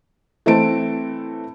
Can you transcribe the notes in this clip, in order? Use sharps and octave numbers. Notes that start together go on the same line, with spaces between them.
E3 A3 C4 A5 D7